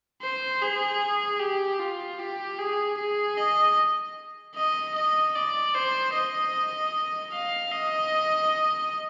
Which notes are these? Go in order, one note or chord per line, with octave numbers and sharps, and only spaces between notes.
C5
G#4
G4
F4
G4
G#4
G#4
D#5
D#5
D#5
D5
C5
D#5
F5
D#5